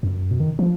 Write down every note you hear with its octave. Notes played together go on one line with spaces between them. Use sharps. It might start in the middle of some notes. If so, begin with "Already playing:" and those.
F#2
B2
D#3
F3